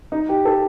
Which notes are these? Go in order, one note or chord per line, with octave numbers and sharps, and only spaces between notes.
D#4
G4
A4